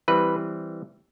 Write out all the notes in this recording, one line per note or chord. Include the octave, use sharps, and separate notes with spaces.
E3 G3 C4 B4